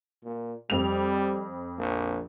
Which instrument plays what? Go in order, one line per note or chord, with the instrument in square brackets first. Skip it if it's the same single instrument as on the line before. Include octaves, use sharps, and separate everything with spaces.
[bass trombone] A#2
[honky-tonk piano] F2 F7 [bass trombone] G3
[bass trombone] A#1